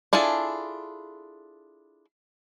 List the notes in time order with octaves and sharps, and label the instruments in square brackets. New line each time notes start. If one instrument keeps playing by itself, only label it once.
[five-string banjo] D4 E4 F4 G#4 A4